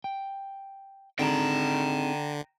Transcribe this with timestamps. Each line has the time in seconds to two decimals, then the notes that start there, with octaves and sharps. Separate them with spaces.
0.04 G5
1.19 D3 C4 D#4 G#4 G5 A#5